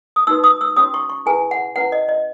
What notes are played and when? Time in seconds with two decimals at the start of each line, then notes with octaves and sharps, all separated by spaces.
0.16 D#6
0.27 D#4 F#4 B4 E6
0.44 D#6
0.61 E6
0.76 C#4 F#4 C#5 D#6
0.94 C#6
1.09 C#6
1.26 E4 G#4 B4 G#5
1.51 F#5
1.76 C#4 E4 B4 F#5
1.92 D#5
2.09 D#5